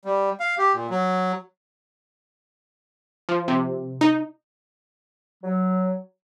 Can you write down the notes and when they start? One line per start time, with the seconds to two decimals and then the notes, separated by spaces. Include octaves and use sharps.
0.05 G3
0.40 F5
0.58 G4
0.74 A#2
0.90 F#3
3.29 F3
3.48 C3
4.01 D#4
5.44 F#3